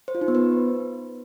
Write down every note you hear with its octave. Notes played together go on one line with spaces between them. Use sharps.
C5
F4
D#4
B3
B4